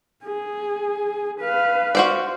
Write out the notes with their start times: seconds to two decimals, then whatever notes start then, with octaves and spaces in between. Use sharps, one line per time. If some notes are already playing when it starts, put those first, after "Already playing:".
0.24 G#4
1.40 B4 F5
1.95 F#4 C5 D5